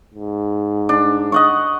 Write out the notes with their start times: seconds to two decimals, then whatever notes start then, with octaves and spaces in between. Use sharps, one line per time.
0.15 G#2
0.89 D4
1.32 D#5 F#5 C#6